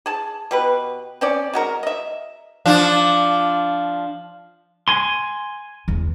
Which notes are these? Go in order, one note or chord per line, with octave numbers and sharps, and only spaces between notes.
G#4 A5
B2 G4 B4
C4 C#4 D5
G#3 F#4 A#4
D#5 E5
F3 D4
G#5 C6
E2